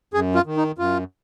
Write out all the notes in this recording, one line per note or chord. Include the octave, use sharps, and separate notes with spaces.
F#2 G#4
F4
D#3
D#4
F#2 F4